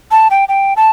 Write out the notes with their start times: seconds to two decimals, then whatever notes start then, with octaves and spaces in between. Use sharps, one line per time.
0.11 A5
0.31 G5
0.49 G5
0.77 A5